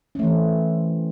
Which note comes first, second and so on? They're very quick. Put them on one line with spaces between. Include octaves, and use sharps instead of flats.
C#4 A3 E3 C4